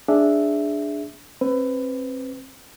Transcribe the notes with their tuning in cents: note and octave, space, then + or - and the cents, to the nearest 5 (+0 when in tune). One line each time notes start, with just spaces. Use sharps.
D4 +0 G#4 +0 E5 +0
C4 +35 B4 +20